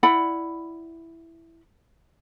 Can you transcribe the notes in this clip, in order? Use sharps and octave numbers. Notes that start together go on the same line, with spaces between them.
E4 D5 F#5 B5